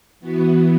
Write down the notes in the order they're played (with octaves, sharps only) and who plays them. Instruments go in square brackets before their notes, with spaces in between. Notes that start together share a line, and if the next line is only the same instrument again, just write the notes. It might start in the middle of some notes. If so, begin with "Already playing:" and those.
[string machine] E3 B3 F#4